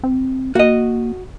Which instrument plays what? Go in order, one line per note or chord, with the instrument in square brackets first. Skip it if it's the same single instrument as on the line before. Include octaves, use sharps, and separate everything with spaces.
[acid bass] C4
[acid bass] A#3 [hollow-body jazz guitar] F#4 D#5